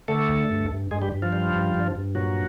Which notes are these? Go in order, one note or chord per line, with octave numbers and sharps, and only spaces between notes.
D3 A3 A4
D2
G2
G2
G2 G#3 G#4
G3 G4
G2
F3 F4
G3
G2
G2
G2
A#2 F#3 F#4